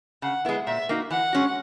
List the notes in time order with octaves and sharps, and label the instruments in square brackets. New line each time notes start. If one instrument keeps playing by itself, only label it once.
[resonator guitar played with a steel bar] C#3 [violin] F#5
[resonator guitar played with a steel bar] G#3 B3 E4
[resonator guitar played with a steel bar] A#2 [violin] E5
[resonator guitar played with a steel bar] A#3 D#4 F#4
[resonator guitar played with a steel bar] E3 [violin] F#5
[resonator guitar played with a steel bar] G#3 C#4 F#4